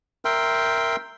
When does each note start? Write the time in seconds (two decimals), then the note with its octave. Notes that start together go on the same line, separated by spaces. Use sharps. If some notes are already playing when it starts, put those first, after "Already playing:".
0.25 A#4 E5 G5 C6